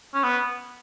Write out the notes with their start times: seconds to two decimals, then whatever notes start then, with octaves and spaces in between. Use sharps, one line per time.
0.14 C#4
0.23 B3